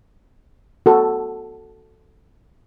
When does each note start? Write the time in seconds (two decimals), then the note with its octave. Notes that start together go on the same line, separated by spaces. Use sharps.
0.86 F#4 A4